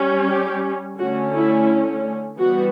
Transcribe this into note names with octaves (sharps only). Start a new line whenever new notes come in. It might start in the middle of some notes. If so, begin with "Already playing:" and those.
Already playing: G3 C#4
G4
D3 A3 C#4 F#4
E4
E3 G3 B3 F#4